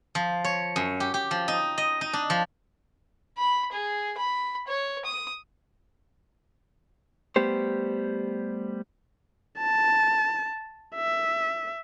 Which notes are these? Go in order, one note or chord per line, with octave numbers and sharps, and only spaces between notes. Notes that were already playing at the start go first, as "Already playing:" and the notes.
F3
C#5
F#2
G4
G4
F3
D#4
D#5
D#4
D4
F3
B5
G#4
B5
C#5
D#6
G3 A3 B3 G4 C5
A5
E5